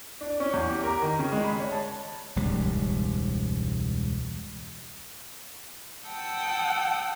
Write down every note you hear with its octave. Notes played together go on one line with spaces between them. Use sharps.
D4
C#4
E2
G4
A#4
D#3
C#3
G#3
B5
C#5
A5
E1 C#2 G#2 G3
F#5 G5 A5 D#6 E6